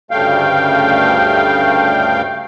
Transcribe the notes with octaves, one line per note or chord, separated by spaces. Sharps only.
D2 G2 C#3 A3 F5 G5